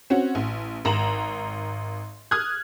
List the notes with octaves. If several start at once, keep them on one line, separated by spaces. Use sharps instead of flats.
C4 C#4 F#4
A1
G#1 A#5 E7 F#7
D#6 F6 F#6 G#6